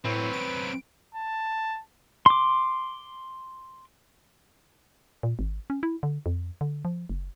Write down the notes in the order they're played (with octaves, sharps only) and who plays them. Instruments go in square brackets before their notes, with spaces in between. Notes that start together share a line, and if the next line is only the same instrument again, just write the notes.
[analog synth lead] A2 [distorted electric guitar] F#3 C4 [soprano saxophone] B4
[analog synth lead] D7
[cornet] A5
[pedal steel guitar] C6 D6
[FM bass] A#2
G#1
C#4
E4
D3
F2
D3
F3
F#1